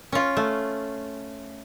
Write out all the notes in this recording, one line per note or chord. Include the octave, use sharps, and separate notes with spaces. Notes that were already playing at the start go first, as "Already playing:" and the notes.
C#4 F4
A3